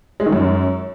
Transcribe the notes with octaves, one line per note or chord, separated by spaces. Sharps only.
G#3
D#3
F#2